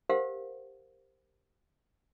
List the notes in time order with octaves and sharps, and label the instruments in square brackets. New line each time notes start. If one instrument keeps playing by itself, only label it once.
[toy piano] G4 A#4 C5 F5 F#5